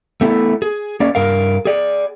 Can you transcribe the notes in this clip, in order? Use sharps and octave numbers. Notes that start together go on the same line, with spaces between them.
A3 B3 E4
G#4
A#3 C#4 D5
G2 A#4 F5
G#4 D5